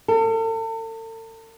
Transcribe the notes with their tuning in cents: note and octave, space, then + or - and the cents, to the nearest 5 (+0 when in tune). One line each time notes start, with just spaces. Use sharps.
A4 +40